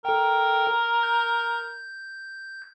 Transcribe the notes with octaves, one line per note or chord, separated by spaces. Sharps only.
A4 A#4 G5
G6